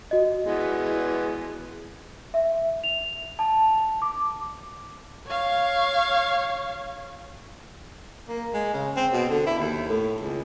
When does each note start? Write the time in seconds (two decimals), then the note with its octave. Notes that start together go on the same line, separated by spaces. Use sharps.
0.11 F#4 D#5
0.44 E3 G#3 B3
2.34 E5
2.84 F7
3.39 A5
4.02 D6
5.27 C#5 F5
8.28 A#3
8.54 G#3
8.73 C#3
8.96 C4
9.13 B2
9.29 D3
9.46 E4
9.59 D#2
9.89 A2
10.20 C#2